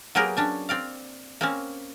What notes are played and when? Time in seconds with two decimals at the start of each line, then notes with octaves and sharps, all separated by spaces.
0.15 F#3 A#3 B3 G4 G#4 A#4
0.37 C#4 D4 G#5
0.69 C4 D5 F5
1.41 A#3 C4 C#4